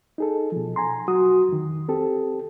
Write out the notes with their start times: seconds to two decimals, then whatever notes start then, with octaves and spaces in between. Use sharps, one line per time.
0.18 D#4 G#4 A4
0.52 B2 F3
0.76 G#5 A#5 C6
1.08 F#3 F#4 D#6
1.49 F2 D#3
1.88 C4 G4 A4